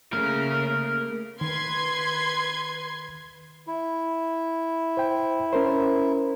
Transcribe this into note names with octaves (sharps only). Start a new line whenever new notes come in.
C#3 A3 A#3 A#4
D#3 B4 C6 G#6
E4
C5 G5
C#4 A#4 C5